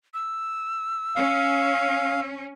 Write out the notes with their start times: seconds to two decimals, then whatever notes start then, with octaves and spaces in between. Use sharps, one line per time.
0.14 E6
1.16 C#4 F5